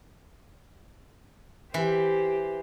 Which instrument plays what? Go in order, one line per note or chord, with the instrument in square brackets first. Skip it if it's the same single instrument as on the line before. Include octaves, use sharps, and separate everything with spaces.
[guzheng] E3 [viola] G4 C5